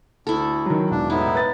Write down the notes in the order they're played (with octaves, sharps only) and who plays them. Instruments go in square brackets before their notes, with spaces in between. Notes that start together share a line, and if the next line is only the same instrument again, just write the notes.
[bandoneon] D2 [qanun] E4 A4
[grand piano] D#3 F#3
[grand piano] E1 [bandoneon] D4
[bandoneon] A2 B3 E4 [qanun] D#4
[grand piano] B4 A6